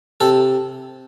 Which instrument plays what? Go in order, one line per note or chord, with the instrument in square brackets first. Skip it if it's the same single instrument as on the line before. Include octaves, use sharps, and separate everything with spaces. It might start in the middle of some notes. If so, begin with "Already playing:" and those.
[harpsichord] C3 A4